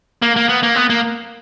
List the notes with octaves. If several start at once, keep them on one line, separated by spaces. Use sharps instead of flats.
A#3
A#3
B3
A#3
B3
A#3